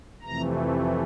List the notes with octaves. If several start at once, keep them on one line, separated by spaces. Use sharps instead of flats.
F2 C3 E3 A3 A#5